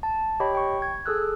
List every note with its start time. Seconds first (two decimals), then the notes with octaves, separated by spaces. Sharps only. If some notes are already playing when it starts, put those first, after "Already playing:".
0.03 A5
0.40 G4 C#5 D#5 G5 B5
0.55 G5 C#6
0.82 G#6
1.06 G#4 A4 E6 F#6